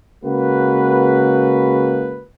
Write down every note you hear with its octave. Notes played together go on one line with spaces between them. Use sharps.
C#3 G#3 A#3 F#4 B4